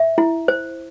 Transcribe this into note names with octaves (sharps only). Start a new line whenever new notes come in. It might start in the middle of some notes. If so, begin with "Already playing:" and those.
Already playing: E5
E4
C5